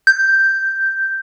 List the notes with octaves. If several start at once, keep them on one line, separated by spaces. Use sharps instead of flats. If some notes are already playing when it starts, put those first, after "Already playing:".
G6